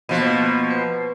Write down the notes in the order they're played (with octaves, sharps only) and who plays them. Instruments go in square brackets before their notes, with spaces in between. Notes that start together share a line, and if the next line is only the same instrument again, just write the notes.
[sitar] B2 F3 [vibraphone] A#3 B3
[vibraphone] B4 C5